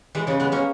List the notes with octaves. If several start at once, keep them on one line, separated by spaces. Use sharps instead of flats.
E3 G#3
C#3 E3
G#3 B3
A#3 C#4